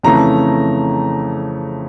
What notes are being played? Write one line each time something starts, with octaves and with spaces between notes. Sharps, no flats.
F2 C#3 E3 A3 A#5